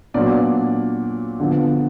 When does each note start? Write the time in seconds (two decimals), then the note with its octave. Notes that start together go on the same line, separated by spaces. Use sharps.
0.14 A#2 F#3 B3 D4 D5
1.40 D3 F3 B3